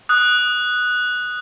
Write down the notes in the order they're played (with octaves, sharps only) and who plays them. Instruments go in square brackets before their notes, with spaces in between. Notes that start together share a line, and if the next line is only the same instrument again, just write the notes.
[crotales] D#6 F#6